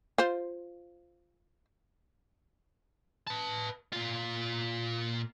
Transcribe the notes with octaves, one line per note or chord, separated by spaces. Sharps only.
F4 C5
B4 A5
A#2 F4